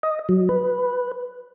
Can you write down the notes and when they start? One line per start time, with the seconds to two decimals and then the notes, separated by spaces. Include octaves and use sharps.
0.03 D#5
0.29 F#3
0.49 B4